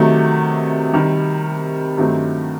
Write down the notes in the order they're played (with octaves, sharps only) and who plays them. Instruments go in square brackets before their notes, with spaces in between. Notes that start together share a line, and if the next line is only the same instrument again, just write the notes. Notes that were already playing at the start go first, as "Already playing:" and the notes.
Already playing: [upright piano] C3 D#3 F#3 A3
C3 D#3 G3
G2 D#3 F#3 A3 C4